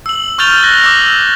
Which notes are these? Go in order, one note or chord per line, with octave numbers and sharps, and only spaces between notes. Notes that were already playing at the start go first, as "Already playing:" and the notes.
E6 F#7
C#6 F6 G6 A6 F7 G7
F#6 A#6
D6 E6